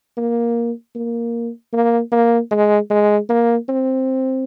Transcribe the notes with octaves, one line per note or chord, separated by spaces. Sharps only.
A#3
A#3
A#3
A#3
G#3
G#3
A#3
C4